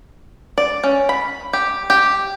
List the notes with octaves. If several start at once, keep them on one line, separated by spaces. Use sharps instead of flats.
D5
C#4
B5
G4
G4